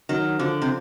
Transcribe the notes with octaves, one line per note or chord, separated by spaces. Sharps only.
D#3 F#3
D3 F3
C3